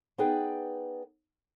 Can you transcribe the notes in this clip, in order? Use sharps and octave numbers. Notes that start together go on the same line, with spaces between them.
B3 D#4 G#4 B4 D5 G5